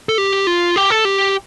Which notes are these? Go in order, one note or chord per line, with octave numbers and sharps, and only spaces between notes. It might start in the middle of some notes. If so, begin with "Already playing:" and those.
A4
G4
F4
G4
A4
G4